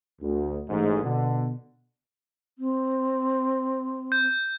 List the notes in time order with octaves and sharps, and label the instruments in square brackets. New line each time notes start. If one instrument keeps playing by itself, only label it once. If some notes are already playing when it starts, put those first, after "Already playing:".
[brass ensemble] D2
A1 G#2
B2 D3
[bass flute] C4
[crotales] G6